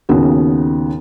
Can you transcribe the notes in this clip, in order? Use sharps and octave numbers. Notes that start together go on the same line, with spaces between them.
D#2 C#3 B3 F#4